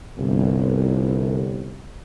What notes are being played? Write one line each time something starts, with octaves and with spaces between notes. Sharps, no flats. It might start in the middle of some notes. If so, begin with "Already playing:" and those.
G1 C2